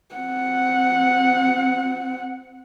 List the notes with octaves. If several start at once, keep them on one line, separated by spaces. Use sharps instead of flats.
C4 F#5